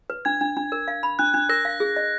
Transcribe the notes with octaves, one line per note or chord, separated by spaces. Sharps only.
B4
D4 G#6
D4
D4
A#4
F5
B5
D4 F#6
D4
A#4 A#6
F5
G#4
D#5